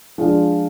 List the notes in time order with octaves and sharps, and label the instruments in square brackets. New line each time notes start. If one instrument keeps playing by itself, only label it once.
[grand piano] F3 G#3 D4 F4